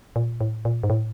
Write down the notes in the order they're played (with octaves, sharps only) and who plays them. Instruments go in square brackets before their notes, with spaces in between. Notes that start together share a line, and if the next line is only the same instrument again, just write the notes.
[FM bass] A#2
A2
A#2
G#2
A2